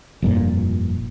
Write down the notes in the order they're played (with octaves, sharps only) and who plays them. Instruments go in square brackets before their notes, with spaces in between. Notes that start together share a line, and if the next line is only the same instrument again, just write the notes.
[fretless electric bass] F1 G2 A#2